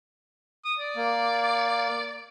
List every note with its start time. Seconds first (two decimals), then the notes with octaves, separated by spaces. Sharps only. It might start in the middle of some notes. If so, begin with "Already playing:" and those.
0.65 D#6
0.78 D5
0.96 A#3